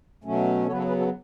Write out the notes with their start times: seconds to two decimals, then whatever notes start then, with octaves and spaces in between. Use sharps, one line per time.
0.24 B2 F#3 A3 C#4
0.66 C#3 F#3 B3 A4 C#5
0.73 B4
0.77 A4 C#5
0.88 G#4 B4
0.99 F#4 A4